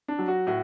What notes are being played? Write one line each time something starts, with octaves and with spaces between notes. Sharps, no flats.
D4
F#3
F#4
A2 F#4